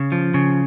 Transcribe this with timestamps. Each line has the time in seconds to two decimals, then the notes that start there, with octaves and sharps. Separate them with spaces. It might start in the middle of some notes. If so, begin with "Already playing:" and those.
Already playing: C#3
0.12 F3
0.34 C#3